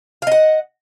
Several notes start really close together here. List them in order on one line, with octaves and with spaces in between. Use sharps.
F5 D#5 F#5